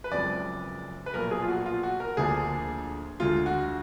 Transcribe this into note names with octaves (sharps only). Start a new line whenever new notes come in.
B4
F#1 F2 F3 G#3 D5
B4
B1 A#2 F3 A#4
G#4
F4
F#4
F#4
F4
F#4
A#4
D2 D3 F3 A#3 D4 G#4
D2 D3 G#3 F4
F#4